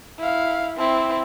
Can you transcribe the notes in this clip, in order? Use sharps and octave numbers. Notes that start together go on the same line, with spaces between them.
E4 F5
C4 E4